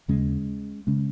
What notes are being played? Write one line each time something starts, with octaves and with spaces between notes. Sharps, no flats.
D#2 C#3 G#3 C#4
C#3 G#3 C#4